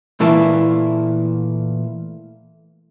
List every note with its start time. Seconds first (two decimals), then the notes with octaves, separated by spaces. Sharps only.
0.20 A#2 E3 A3 A#3 E4